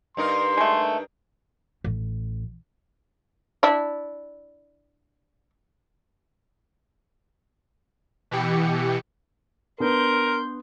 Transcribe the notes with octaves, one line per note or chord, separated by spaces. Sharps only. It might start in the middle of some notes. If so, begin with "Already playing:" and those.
G2 D#4 A#4 C6
G#3 A3
A1
D4 E4
B2 E3 G4 C#7
B3 D4 A#4 C6 G6